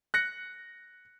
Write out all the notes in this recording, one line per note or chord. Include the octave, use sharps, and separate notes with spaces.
F#6 A#6 C#7